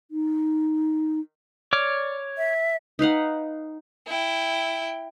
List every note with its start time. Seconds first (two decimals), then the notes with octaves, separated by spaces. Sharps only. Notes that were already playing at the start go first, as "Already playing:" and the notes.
0.11 D#4
1.73 C#5 D5 D6 F6
2.37 E5
2.99 D#4 B4 F5 F#5
4.07 E4 G5